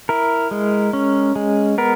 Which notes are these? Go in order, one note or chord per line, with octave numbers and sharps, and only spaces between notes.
E4 A#4
G#3
C#4
G#3
B3 A#4